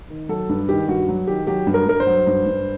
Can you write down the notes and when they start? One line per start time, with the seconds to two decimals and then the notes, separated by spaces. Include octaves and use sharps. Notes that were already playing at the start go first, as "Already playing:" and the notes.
0.10 D#3
0.29 F#3 A4
0.49 G2
0.69 D#3 G4
0.88 G2 F#4
1.09 F#3
1.27 D#3 G4
1.47 F#3 G4
1.67 G2
1.74 A#4
1.87 G2 A#4
2.00 C5
2.07 F#3
2.27 G2
2.46 G2